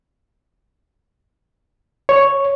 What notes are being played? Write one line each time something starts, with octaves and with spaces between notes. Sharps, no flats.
C#5